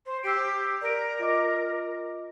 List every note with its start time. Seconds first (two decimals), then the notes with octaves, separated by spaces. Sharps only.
0.05 C5
0.23 G4 E6 C7 D7
0.81 A#4 D5 D7
1.19 F4 D#5 D6